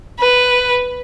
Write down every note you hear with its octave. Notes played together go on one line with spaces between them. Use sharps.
B4